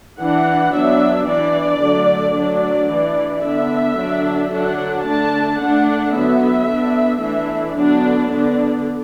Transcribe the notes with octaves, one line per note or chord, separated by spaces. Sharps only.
E3 D4 F#5
F#3 B3 D4 E5
E3 D4 D5
D3 F#3 A3 D4
F#3 A3 D4 D5
E3 D4
D3 B3 D4 E5
D3 F#3 D4
D3 F#3 D4 F#5
D3 A3 D4 A5
D3 A3 D4 F#5
D3 F#3 B3 E5
D3 B3 D4
E3 A3 D4 E5
D3 F#3 B3 D4 D5
D3 B3 D4